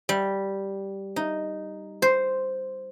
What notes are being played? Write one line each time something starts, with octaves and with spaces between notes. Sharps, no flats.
G3
D#4
C5